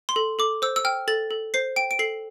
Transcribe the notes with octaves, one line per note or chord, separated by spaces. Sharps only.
C6
A4
A4 D6
C5 E6
E6
G5 F6
A4 A6
A4
C5 C7
G5 D7
D7
A4 C7